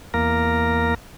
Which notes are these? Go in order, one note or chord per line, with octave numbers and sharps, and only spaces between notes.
E2 A#3 A#4